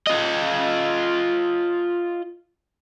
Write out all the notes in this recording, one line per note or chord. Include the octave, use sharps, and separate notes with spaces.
F4 D#5